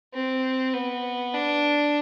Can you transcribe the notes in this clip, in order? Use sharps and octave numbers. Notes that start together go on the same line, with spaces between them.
C4
B3
D4